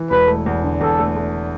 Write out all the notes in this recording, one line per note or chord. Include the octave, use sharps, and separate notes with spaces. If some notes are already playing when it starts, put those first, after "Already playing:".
Already playing: E3
E1 B4
A3
E2
D3
E2 A4
A3
A3